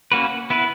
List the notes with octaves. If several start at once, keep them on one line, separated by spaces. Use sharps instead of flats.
A#3 C#4 F#4 B4
B3 E4 B4